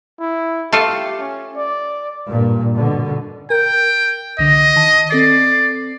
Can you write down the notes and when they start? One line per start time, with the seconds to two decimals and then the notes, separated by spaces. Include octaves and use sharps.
0.20 E4
0.72 A3 F4 G4 A4
1.19 C#4
1.57 D5
2.28 G2 A#2
2.75 B2 D3
3.50 A#4 G5
4.39 C2 D3 D#5 A#6
4.76 D#3 A5
5.11 C4 A4 D5 C7